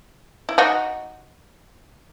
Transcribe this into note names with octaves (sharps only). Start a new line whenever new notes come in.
E4
D#4 F#4